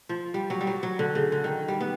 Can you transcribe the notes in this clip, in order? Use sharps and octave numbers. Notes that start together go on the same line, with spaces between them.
F3
G3
F#3
G3
F#3
F#3
D3
C#3
D3
D#3
G3
B3